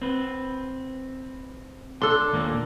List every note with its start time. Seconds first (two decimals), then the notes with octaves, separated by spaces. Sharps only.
0.02 C4 B4
2.02 D4 A4 C6
2.32 D#2 A#2 A#3